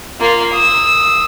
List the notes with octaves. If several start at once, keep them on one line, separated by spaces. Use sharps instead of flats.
A#3 F4
D#6 E6